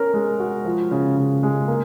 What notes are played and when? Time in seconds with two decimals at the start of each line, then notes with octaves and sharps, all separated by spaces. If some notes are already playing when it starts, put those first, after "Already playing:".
Already playing: C#4 A#4
0.14 G#3
0.40 F#4
0.65 F3
0.91 C#3
1.17 C#3
1.43 G#3
1.68 A#3